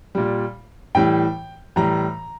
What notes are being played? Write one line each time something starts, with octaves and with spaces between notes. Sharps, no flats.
A#2 G3
A2 E3 G3 G5
A2 E3 G3 A#5